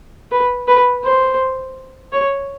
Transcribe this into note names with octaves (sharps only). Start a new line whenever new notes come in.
B4
B4
C5
C#5